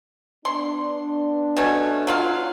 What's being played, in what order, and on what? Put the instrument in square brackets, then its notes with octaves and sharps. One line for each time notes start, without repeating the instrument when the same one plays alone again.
[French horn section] B3 D4 [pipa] C6
[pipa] B2 A3 C#4
F#3 F4 F5